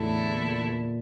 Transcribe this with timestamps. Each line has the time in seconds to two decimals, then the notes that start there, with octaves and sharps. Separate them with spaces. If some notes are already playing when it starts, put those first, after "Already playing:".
Already playing: E2 A2 D3 A3 E4 A4
0.34 A#2